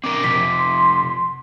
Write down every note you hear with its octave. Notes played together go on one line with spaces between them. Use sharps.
C4 D4 A#4 D6
C3 F3 D6 B6
C6